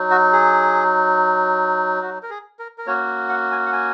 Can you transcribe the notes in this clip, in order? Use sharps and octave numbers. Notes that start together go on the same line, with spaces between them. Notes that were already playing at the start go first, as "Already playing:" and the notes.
Already playing: F#3 D#4
F#4
G#4
F#4
A#4
G#4
A#4
A#4
A#3 C#4 F#4 C#5
F#5
G#5
F#5
G#5